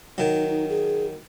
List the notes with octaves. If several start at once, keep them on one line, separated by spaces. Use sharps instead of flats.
D#3 F#3 D#4
D#4
G#4